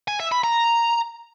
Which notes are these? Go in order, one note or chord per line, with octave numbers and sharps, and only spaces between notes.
G#5
E5
B5
A#5